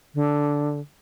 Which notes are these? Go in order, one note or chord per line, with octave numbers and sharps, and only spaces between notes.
D3